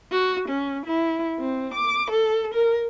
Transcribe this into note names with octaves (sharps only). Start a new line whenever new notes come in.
F#4
C#4
E4
C4
D6
A4
A#4